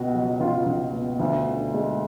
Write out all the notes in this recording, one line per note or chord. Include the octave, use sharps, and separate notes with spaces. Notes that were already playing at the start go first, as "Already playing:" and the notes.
Already playing: C#2 B2 F#4
F#3
C#2 F4
C#2
B2
D2
D3
G#3